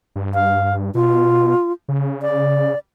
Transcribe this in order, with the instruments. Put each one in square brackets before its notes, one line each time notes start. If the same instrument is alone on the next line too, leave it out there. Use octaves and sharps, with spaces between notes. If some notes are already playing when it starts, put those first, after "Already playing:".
[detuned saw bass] G2
[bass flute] F5
[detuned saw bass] B2 [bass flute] F4
[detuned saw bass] C#3
[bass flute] D5